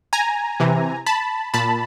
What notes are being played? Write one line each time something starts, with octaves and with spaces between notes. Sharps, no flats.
G#5 A#5
C3 E3
A5 B5
A#2 A5 B5